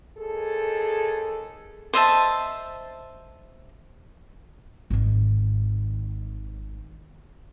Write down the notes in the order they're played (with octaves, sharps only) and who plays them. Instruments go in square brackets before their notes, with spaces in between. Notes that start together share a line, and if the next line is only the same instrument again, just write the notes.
[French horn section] D#2 G#4 A4
[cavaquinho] C5 D#5 E5 A5
[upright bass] G#1 D#3